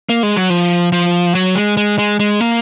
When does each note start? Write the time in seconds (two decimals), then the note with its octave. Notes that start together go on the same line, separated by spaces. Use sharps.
0.09 A#3
0.23 G#3
0.37 F#3
0.50 F3
0.92 F3
1.35 F#3
1.55 G#3
1.77 G#3
1.98 G#3
2.20 G#3
2.41 A#3